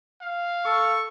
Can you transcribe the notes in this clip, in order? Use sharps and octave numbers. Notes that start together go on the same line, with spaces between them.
F5
A4 C#6